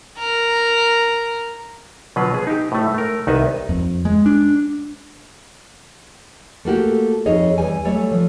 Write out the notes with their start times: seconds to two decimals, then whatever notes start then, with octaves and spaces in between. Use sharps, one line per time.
0.18 A#4
2.16 B2 D3 F#3 F4 B4 F5
2.34 B3 G#4
2.47 D#4 G4
2.72 A2 A3
2.94 A3 A#4
3.27 C2 D#3 B3 D#4 B4 E5
3.69 F2
4.05 G#3
4.26 D4
6.65 A3 A#3 F#4 G4
7.26 F2 D#4 G#4 C#5 D#5
7.58 E2 G3 G#5
7.84 F#3 G3 A3 C#5
8.12 F3